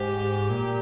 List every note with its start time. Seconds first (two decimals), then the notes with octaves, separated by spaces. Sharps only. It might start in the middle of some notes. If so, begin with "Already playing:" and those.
Already playing: G#2 G4
0.50 A#2